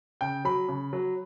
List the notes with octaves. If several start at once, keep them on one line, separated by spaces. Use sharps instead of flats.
C#3 G5
F#3 B5
C#3
F#3